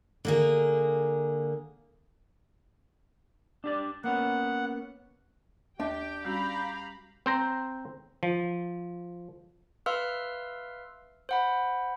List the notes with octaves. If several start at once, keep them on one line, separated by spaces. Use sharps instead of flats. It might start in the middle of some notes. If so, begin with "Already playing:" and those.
D3 A#3 G#4
D4 G4 D5
A#3 B3 C#4 F#5
D#2 D4 G4 G5
G3 C#4 F#4 F5 A#5 B5
C4 C5 A#5
F3
B4 E5 F5 C6 E6 F6
C5 F#5 B5